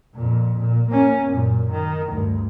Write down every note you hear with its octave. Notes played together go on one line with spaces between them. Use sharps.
F2 A#2
A#2
A#3 C#4
F#2 A#2
D#3
D2 G2